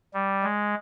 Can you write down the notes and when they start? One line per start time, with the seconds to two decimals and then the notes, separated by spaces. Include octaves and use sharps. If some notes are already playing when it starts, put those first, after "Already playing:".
0.14 G3
0.43 G#3